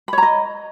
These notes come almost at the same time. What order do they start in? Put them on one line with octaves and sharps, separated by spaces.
B5 C#5 A#5 D#5